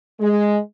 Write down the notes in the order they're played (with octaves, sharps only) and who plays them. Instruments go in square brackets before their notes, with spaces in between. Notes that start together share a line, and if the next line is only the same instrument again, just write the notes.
[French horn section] G#3